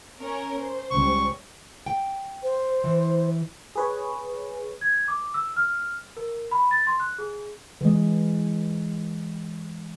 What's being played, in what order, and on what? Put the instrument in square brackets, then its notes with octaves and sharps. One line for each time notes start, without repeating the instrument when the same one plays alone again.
[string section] C#4 A#4 C#5
C5
[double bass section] C#2 G3 C#4 [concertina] C#6
[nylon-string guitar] G5
[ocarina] C5
[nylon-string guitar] E3
[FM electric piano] G#4 B4 C#5
[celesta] G#6
D6
E6
F6
A#4
B5
A6
C6
F#6
G#4
[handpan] E3 G#3